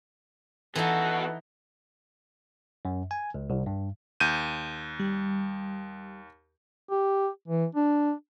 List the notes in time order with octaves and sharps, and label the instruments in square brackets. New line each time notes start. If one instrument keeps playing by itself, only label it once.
[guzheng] E3 D#4 [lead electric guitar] B3 F#4 [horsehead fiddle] A4 F#5
[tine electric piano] F#2
G#5
C#2
C2
G2
[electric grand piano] D#2 G6 D#7
[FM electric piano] G3
[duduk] G4
E3
D4